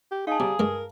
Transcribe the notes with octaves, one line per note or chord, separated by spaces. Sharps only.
G4
D#4 G#4 F5 A5
C3 G3 A#5
G2 G#3 A#4